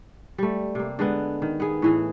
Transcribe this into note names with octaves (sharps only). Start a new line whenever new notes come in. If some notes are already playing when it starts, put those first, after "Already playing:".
G3 A3
C3 A#3
D3 G#3 B3
D#3
B3 G#4
A2 E3 G#4